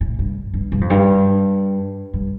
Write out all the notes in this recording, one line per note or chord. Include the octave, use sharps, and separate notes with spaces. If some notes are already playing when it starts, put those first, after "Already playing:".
A2
G2
G2
G2
F2
G2
G2